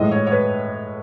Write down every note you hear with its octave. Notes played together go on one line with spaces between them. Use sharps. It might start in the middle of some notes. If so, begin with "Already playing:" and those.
Already playing: A2 E3 G#3 D#5
C#5
C#5
B4